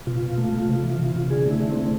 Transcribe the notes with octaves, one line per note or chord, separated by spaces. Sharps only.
B2 F4
B2
A3
A3
C3
E3
C3
C3
D3 G#4
A3 E4
D3
C4
A3